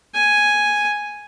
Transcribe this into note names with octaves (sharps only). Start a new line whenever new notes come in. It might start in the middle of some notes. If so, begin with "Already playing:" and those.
G#5